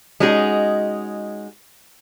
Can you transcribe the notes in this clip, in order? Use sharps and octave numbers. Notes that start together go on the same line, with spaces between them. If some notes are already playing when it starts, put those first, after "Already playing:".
G#3 C#4 D#4 F#4 G#4